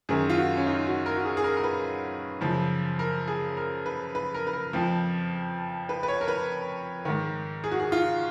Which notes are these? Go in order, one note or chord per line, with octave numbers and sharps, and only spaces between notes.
F#2 D#3 G#4
F4
F#4
C#4
D#4
F#4
A#4
F#4
G#4
G#4
A#4
A#4
B4
F#2 C#3 F3
A#4
G#4
A#4
B4
B4
A#4
B4
A#4
F2 F3
B4
B4
C#5
A#4
B4
G#2 D#3
G#4
F#4
G#4
F4